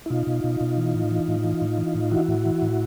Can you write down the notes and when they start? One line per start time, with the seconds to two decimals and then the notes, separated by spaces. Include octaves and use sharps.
0.06 E4
0.10 B2 D#4 F4
0.27 B2
0.44 B2
0.61 B2
0.78 E3
0.94 A2
1.11 E3
1.28 A2
1.44 E3
1.62 A2
1.78 E3
1.95 A2
2.12 E3 E4 F#4
2.28 A2
2.45 E3
2.62 A2